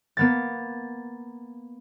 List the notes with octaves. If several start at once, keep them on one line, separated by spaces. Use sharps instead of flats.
A#3 B3 A6